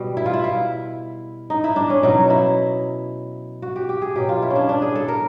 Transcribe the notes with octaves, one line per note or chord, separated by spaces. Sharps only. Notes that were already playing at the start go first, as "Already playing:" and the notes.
Already playing: B2 G3
E4
F4
E4
E4
D#4
E4
D4
C#4
B2 F#3 D#4
E4
F#4
G4
G4
G#4
B2 F#3 G4
F4
E4
C#4
D4
D4
G#4
A4
A#4